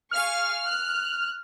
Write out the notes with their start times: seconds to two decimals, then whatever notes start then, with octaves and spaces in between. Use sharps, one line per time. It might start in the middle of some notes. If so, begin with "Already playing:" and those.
0.11 G#4 F5 C#6 F6
0.67 F#6